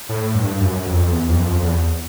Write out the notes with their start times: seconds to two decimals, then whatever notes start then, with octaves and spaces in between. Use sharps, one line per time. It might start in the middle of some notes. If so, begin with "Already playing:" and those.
0.09 A2
0.35 G2
0.60 F#2
0.86 F2
1.11 E2
1.28 F2
1.39 F#2
1.45 F2
1.63 E2